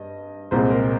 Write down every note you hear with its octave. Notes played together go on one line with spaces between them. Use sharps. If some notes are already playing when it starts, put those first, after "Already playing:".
Already playing: G2 D#5
C2 A#2 G#3 C4 C5
A#4